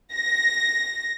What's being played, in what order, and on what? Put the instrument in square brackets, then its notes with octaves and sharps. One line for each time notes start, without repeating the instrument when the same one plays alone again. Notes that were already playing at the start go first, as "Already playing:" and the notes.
[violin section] A#6